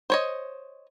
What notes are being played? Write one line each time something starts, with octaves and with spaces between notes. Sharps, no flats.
C5 C#5 D#5